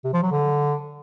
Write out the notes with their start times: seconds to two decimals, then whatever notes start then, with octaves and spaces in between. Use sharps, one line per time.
0.04 C3
0.14 F3
0.23 F#3
0.32 D3